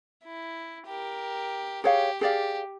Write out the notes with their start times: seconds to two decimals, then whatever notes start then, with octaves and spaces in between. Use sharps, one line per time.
0.24 E4
0.87 G4 A#4
1.84 G4 G#4 C#5 F5
2.21 G4 G#4 D5 F5